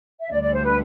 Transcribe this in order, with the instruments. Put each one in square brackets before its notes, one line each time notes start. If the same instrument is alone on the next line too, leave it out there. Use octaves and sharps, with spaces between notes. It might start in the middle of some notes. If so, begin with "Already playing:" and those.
[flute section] E5
[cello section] D2 D3 G3 [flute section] D5
[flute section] D5
C5
B4